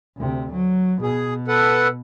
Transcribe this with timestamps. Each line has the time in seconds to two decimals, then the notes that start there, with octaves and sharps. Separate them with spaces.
0.17 D2 C3
0.53 F#3
1.02 B2 G#4
1.48 A4 B4 F#5